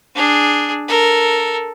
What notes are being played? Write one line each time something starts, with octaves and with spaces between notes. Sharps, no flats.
D4 G#4
A4 A#4